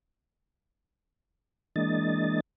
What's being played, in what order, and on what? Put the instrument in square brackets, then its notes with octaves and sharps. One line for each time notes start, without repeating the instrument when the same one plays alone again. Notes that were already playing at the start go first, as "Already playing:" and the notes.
[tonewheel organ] E3 G#3 A#3 D4 D#5 A6